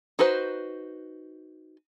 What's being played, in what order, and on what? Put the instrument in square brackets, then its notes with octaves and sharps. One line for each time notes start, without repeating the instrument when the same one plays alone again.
[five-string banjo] D#4 F#4 B4 C5